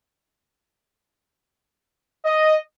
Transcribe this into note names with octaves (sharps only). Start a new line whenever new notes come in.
D#5